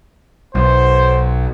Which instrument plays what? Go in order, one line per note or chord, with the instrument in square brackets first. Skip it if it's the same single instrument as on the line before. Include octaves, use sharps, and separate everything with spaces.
[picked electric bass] B1 [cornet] C5